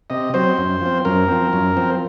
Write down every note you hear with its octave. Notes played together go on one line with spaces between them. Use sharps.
C3 D#5
F#3 C4 C5
F#2
F3 C4
F#2 A#4
F3 C4
F#2
F3 C4